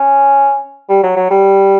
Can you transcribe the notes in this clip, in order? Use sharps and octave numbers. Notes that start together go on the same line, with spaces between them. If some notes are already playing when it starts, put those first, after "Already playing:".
Already playing: C#4
G3
F#3
F#3
G3